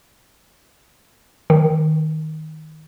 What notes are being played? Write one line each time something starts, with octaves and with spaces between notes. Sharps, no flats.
D#3